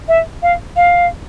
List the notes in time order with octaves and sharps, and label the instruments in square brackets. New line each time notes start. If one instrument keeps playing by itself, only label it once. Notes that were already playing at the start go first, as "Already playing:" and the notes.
[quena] E5
F5
F5